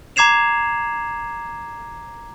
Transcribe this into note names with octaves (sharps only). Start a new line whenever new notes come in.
A#5 D6 G#6 C7 E7 F7